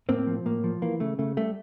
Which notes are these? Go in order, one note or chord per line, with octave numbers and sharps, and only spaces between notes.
A2 A#3 C4
F3
A2 A#3
F3
E3 A#3
C#3 A3
C#3 A3
G3 A3